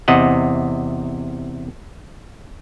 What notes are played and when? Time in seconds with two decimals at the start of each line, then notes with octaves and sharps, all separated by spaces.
0.08 E2 C3 D#5 F#5